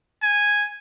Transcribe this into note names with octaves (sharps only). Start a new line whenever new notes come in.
G#5